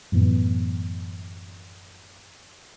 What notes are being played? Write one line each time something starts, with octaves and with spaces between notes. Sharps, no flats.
F#2 A2 E3 B3